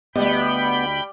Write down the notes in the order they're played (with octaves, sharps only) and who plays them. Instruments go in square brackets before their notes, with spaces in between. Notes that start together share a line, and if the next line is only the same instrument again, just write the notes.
[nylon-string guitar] D2 D#5 [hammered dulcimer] G3 [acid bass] B3 [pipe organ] G5 B5 G6